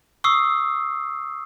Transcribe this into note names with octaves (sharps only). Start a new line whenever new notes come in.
C#6 D#6 E6 C7